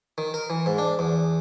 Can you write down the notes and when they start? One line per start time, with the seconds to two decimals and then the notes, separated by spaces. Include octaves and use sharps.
0.18 D#3
0.34 A#4
0.50 E3
0.66 G#2
0.78 D4
0.99 E2